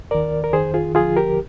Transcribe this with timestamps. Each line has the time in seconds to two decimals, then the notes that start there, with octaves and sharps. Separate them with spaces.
0.11 D#2 D#3 A#4 D5
0.44 A#4
0.53 D#3 G#4 C5
0.58 F2
0.74 F4 G#4
0.95 D#2 D3 F3 F4 G#4
1.17 G4 A#4